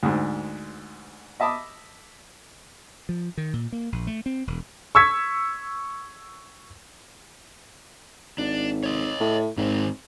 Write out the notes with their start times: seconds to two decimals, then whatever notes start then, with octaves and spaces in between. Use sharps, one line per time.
0.03 D2 G#2
1.40 D#5 E5 A5 B5 D6 D#6
3.09 F3
3.37 D#3
3.53 A#2
3.72 A#3
3.92 A#1
4.07 A3
4.26 C4
4.47 E1
4.95 C#6 E6 G#6 B6
8.38 G#1 D4
8.83 C#5 D#5
9.20 A2
9.57 G#1 G#2 C4